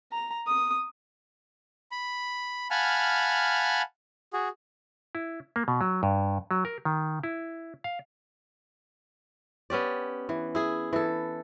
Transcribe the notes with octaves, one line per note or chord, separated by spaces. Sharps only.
A#5
D#6
B5
F5 F#5 G#5 A5 B5 F6
F#4 G#4
E4
A#3
B2
F#3
G2
F#3
A#4
D#3
E4
F5
B3 C#4 G4 D5
E3
E4 G#4
E3 A4